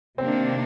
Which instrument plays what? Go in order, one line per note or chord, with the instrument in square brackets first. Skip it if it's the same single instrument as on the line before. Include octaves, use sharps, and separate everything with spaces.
[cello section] C3 D#3 A#3 D4 [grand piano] C4